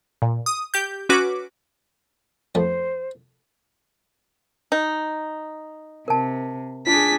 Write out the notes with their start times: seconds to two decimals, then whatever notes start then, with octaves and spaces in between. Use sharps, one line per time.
0.22 A#2
0.46 D#6
0.74 G4 G6
1.09 C#4 F#4 B4 D6
2.55 F2 A3 B3 C5
4.72 D#4
6.08 C3 A#4 A5
6.87 D4 F4 G#4 B6